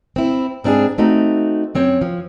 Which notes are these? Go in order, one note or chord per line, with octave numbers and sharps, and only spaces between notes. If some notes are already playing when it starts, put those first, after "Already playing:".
C4 E4
G#2 C4 D4 E4 G#4
A3 C4 D#4 F#4
F#2 C4 C#5 G5
F3